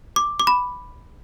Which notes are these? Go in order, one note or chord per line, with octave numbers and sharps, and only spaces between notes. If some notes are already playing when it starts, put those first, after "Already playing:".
D6
D6
B5